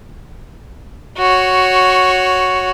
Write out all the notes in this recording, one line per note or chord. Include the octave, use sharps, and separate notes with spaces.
F#4 C#5